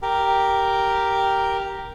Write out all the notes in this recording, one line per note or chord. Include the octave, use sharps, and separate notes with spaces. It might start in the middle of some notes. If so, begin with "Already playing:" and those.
G4 A#4